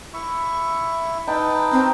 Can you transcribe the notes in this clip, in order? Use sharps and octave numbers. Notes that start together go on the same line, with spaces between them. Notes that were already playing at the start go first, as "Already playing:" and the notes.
E4 E5 C#6
D#4 B4 G5 A5
C4 A#5